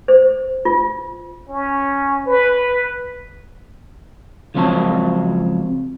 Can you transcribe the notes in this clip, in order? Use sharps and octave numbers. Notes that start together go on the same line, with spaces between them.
C5
F4
C#4
B4
C#2 F3 F#3 C4 C#5 A5